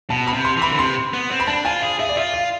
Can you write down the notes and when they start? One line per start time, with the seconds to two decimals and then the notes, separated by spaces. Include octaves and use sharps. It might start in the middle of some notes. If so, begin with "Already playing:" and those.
0.10 B2 A5
0.27 B5
0.33 C3
0.45 C6
0.57 E3
0.62 B5
0.70 D3
0.79 C3 C6
1.13 B3
1.31 C4
1.40 B5
1.47 D4 A5
1.65 F4 G#5
1.82 G#4 F5
1.99 G#4 E5
2.09 D5
2.17 F4 E5
2.34 F5